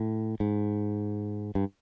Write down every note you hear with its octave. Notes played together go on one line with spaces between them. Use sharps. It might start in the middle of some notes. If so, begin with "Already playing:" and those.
Already playing: A2
G#2
G2